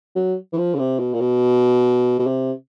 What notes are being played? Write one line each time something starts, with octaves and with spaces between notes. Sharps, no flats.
F#3
E3
F3
C#3
C3
B2
A#2
B2
B2
C3